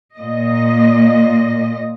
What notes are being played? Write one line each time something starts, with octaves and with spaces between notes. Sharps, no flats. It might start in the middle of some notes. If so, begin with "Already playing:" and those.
A#2 D#5